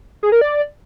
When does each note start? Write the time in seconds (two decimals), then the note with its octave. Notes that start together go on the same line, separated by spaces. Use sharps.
0.23 G#4
0.32 A#4
0.41 D5